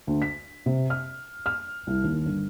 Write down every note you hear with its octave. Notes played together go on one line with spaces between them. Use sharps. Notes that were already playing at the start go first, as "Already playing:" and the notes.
D2
B6
C3
F6
F6
C2
D#2
G1